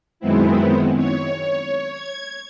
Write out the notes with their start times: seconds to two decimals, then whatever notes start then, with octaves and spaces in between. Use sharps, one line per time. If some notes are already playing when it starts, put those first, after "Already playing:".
0.20 F#2 D#3 G#3 B3 C4 E4
0.96 C#5
1.92 G#6